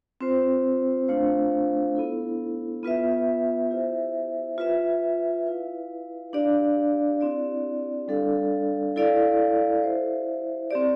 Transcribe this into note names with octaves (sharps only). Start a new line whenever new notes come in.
C4 F4 C5
A3 D4 F4 C5 F5
B3 E4 A4
B3 F4 B4 E5
E4 G4 C5 E5
F4 B4 E5
E4 B4 F5
D4 G4 D5 F5
C4 E4 G4 D5
G3 D4 A4 D5 F5
E4 A4 D5 F5
E4 G4 C5 E5
C4 G4 D5